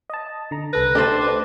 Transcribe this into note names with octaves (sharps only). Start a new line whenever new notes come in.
D#5 A5
D3 A#5
C2 A4 B4 A#6
A3 D4 G4 A4 C5
B4